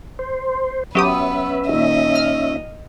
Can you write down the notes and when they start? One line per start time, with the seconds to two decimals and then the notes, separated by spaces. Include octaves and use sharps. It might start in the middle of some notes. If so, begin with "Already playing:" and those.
0.19 C5
0.95 F#3 B3 C#4 G4 B4 E5 D#6
1.69 A#2 D#3 D#5
2.15 F6